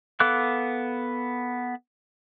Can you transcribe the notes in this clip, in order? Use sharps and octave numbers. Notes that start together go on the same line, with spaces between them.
B3 A4 F5 D6 F#6